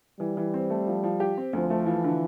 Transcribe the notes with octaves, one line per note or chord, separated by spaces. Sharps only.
E3 G3
E3
C4
A3
F3
F3
G4
C4
D2 F3
A3
E3 F3
D3